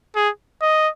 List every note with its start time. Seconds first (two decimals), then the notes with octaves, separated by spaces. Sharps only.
0.15 G#4
0.62 D#5